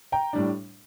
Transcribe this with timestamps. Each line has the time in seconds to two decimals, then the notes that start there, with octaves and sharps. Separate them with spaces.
0.12 G5 A#5
0.33 A2 G3 D4